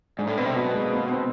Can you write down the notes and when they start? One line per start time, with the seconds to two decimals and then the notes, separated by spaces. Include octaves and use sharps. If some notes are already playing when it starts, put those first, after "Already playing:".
0.18 G#2 D4
0.27 A2
0.37 B2 C4
0.46 C3
0.55 B2 F#3
0.75 G#3
0.84 A#3
0.93 C4
1.12 C4